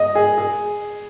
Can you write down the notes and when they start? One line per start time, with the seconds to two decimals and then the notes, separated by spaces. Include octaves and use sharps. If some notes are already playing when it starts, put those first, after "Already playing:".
Already playing: D#5
0.15 G#4
0.38 G#4